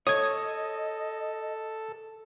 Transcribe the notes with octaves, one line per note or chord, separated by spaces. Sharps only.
A4 C#5 D#5 D#6 G#6